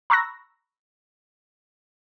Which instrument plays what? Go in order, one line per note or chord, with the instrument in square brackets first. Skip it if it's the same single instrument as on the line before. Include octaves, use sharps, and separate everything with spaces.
[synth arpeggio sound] A#5 B5 C#6 E6 F#6 A#6